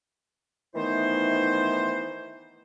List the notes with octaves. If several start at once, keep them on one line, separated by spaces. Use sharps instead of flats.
D#3 E3 A3 B3 D#4 C5